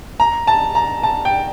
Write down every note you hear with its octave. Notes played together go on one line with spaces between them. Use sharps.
A#5
A5
A#5
A5
G5